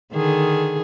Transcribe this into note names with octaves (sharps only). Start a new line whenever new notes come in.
D3 D#3 G#4